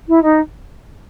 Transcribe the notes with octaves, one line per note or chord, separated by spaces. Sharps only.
E4
D#4